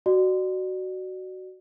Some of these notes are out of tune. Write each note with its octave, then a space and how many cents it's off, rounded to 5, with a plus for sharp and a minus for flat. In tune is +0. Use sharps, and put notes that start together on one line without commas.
F#4 +15 D5 +35